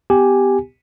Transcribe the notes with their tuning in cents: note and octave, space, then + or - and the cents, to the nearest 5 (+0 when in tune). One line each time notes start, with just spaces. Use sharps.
B3 +25 G4 +0 G#5 +0